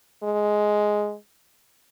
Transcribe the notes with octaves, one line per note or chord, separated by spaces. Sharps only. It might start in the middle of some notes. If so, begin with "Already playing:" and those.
G#3